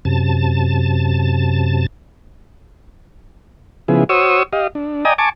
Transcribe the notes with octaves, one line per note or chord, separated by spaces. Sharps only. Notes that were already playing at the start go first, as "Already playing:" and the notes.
F#2 C3 A5
C#3 F3 B3 E4 G#4
F#4 C5 C#5 C#6 D#6 E6
G4 D#5 F5
D4
D5 D#5 G5 G#5 A#5 D#6
G#5 A5 C#6 D6